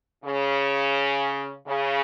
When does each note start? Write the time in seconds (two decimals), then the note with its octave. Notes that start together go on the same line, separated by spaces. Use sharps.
0.24 C#3
1.67 C#3